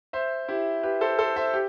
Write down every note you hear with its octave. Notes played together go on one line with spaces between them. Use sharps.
C5 E5
E4 G4
G4 B4
A4 C5
A4 C5
C5 E5
G4